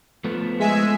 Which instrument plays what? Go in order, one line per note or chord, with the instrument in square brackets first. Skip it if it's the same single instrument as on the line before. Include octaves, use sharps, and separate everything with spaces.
[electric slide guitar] F3 A3 B3
[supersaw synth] G#3 E5 G#5